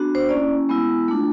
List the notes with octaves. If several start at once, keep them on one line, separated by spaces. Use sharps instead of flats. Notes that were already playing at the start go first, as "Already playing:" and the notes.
Already playing: B3 D4 F#4
C5
A#3 C#4 E4 D5
G#3 B3 E4
A3 D4 F4